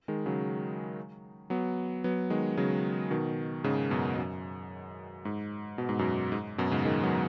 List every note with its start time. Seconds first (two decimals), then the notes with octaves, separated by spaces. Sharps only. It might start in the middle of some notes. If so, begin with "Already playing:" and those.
0.08 D#3 G#3
0.26 C#3 F#3
1.50 F#3 B3
2.04 F#3 B3
2.30 D#3 G#3
2.57 C#3 F#3
3.11 B2 D#3
3.64 G#2 C#3
3.91 F#2 B2
4.17 F#2
5.25 G#2
5.78 B2
5.89 G#2
5.99 F#2 B2
6.32 G#2
6.58 F#2 B2
6.71 G#2 C#3
6.85 D#3 G#3
7.03 F#3 B3